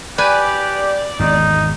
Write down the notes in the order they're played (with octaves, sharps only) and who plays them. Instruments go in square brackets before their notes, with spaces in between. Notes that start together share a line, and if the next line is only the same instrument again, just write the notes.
[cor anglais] G4 [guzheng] B4 G#5 [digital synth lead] D5
[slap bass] G#1 E2 [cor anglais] D#4